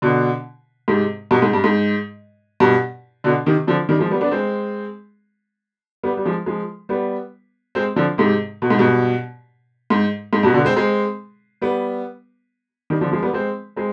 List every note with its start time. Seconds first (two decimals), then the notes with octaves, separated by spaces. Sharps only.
0.02 B2 D3
0.88 G#2 C3
1.31 G2 B2
1.42 G#2
1.53 G2
1.64 G#2
2.60 G2 B2
3.24 B2 D3
3.46 C3 D#3
3.67 D3 F3
3.89 D#3 G3
3.99 F3 G#3
4.11 G3 B3
4.21 B3 D4
4.31 G#3 C4
6.03 G3 B3
6.17 G3
6.25 F3 G#3
6.46 F3 G#3
6.89 G3 B3
7.75 G#3 C4
7.96 D3 F3
8.18 G#2 C3
8.62 B2
8.70 G#2
8.79 G2 B2
9.90 G#2
10.33 G#2
10.43 G2 B2
10.54 B2 D3
10.65 G#3 C4
10.76 G#3 C4
11.62 G3 B3
12.90 D#3 G3
13.01 D3 F3
13.12 F3 G#3
13.23 G3 B3
13.33 G#3 C4
13.76 G#3 C4